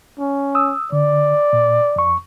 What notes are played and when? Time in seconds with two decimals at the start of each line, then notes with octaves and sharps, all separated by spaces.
0.20 C#4
0.55 D#6 E6
0.92 D3 D5
1.53 A#2
1.96 F2 C#6